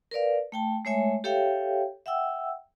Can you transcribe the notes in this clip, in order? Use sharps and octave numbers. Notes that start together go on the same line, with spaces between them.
A#4 B4 D5 F5
A3 G5 A5
G#3 A3 C#5 E5 G#5
G4 A4 C#5 E5 F5 G5
E5 F#5 G5 E6